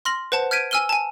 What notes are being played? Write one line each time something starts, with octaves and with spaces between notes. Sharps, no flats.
C6 F6 A#6 F#7
B4 C5 F#5 A5
F6 G6 G#6 B6 D7 D#7
G#5 E6 F6 D#7 G7
G#5 A5